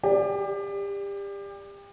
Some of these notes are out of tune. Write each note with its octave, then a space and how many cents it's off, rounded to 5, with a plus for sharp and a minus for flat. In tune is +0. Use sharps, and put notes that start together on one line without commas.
G4 +30 D5 +0